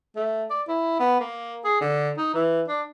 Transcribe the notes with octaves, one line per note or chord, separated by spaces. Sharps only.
A3
D5
E4
B3
A#3
G#4
D3
D#4
E3
D4